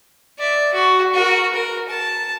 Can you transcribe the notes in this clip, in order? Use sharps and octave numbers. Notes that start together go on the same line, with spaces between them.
D5 E5
F#4
F#4 A#4
A#4
A5